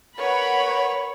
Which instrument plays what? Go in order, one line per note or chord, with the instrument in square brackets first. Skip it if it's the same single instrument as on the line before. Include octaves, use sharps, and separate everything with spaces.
[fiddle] A#4 B4 [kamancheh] C#5 [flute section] F#5 [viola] B5